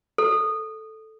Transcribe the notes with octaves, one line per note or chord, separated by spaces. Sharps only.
A4